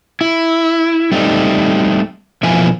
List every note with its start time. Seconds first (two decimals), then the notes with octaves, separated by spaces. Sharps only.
0.21 E4
1.12 G3 A3 C4 D#4
2.43 B2 E3 F3 A#4 E5 G#5